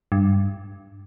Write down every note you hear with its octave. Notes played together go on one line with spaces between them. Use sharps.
G2